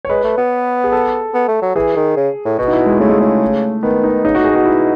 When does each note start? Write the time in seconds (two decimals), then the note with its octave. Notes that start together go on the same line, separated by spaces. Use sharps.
0.05 C#5
0.10 G#3 B4
0.24 A3
0.38 B3
0.84 G#4
0.92 A4
1.34 B3
1.48 A3
1.62 F#3
1.76 E3 G#4
1.96 D#3
2.17 C#3
2.45 A2
2.58 B2 F#4
2.68 D#4
2.73 E4
2.86 G#3
3.00 C#3 A3
3.09 G#3
3.19 C#3 A3
3.83 D#3 B3
4.03 D#4
4.24 C#3 D#4
4.35 A2 F#4
4.44 G#4
4.52 B2 F#4
4.66 E4